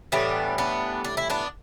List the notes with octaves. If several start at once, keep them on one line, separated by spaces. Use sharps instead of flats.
A2 E3 G3 B3 D4
B3 D4
D4
E4
B3 D4